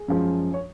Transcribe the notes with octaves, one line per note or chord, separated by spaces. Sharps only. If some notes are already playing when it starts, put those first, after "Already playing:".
Already playing: G#4
F#2 F3 G#3
C#5